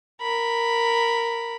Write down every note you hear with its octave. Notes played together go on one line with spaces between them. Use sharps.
A#4 B5